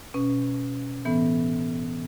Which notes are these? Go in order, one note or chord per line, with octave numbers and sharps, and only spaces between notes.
B2 C#4
A2 E3 B3